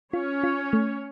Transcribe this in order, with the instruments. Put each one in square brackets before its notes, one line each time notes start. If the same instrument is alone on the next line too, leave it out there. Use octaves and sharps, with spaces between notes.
[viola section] C#4 C#5 [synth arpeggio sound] F4
[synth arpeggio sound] F4
A3